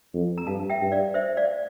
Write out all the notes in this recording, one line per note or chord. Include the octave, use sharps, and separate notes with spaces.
F2
A#5
G2 F5 A5
E5 G5
G2
D5 F5
C5 E5
D5 F5